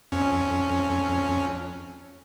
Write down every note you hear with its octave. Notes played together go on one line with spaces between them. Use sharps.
F2 C#4